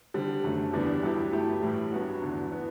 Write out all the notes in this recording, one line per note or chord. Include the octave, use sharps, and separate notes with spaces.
D3 G3 C4
F#2 D3 F#3 A3
E2 D3 G3 B3 D4
G2 F#3 B3 E4 G4
F#3 A3 E4 G4
A2 E3 G3
G2 F#3 B3 F#4
E2 D3 F#3
E3 B3 F#4